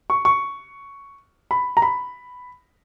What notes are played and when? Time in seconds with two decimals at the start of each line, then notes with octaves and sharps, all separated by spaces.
0.10 C#6
0.25 C#6
1.51 B5
1.77 A#5
1.82 B5